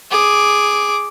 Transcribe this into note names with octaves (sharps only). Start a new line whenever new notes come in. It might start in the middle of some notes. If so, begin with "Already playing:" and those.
G#4 D6